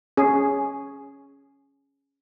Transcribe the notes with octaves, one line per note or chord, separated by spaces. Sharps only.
C#4 G#4